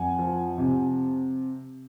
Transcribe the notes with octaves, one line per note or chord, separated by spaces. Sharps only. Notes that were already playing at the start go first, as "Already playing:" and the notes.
Already playing: F2 F#5 G#5
F3
C3